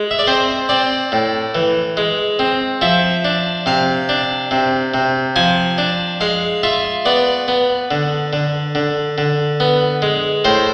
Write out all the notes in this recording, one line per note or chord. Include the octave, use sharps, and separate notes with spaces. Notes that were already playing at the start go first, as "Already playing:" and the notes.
Already playing: G#3
E5
D5
C4 C5
C4 D5
A2
E3
G#3
C4
F3 E5
D4
C3 F5
D4
C3
C3
F3 G#5
D4
G#3 F5
F4 E5
B3 D5
B3
D3
D3
D3
D3
B3
G#3
A2 C5